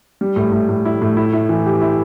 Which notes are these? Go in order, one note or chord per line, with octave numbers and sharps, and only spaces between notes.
G3
A2
A2
A2
E4
A2
E4
E4
E3
G4
E4